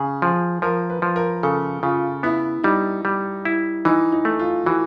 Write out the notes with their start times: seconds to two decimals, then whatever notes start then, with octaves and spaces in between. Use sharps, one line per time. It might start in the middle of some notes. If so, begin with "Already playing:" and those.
Already playing: C#3 G#4
0.22 F3 G#4
0.62 F3 A#4
0.90 B4
1.02 F3
1.16 A#4
1.43 C#3 A4
1.83 C#3 F4
2.23 B3 E4
2.64 G3 D#4
3.05 G3
3.45 E4
3.85 E3 D#4
4.12 D#4
4.25 A3
4.39 F4
4.66 E3 F#4